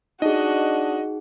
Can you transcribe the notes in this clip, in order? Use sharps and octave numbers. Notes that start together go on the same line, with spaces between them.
D4 D#4 F#4 G#4 D#5